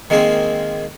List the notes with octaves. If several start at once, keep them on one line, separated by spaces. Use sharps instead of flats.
D#3 G#3 A#3 C4 G#4